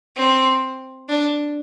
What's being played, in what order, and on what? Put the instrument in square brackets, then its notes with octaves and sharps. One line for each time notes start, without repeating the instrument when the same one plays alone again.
[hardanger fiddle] C4
D4